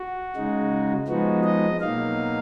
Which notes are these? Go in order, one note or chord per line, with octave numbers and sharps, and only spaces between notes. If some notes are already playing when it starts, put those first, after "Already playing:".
Already playing: F#4
C#3 G#3 D#4
F3 G#3 B3 D#4 F#4
D#5
B2 F#3 A#3 D#4 F5